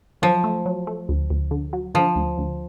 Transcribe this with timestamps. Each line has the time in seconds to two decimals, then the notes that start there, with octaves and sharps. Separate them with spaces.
0.22 F3 F#3
0.44 A3
0.66 F#3
0.87 A3
1.09 D2
1.30 D2
1.51 D3
1.73 F#3
1.95 D3 F3
2.16 D2
2.38 D2